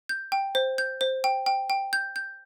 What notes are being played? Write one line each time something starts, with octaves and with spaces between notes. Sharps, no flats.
G6
G5
C5
G6
C5
G5
G5
G5
G6
G6